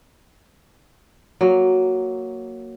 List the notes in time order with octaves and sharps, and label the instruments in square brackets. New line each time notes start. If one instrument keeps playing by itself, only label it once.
[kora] F#3 A#3